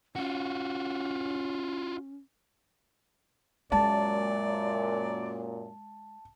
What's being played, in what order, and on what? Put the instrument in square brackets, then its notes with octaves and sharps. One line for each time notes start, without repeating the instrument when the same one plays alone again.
[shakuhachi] C#4 [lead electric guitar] F4 F#4
[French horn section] F#2 A#2 [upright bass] G#3 [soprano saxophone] D5 [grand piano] A5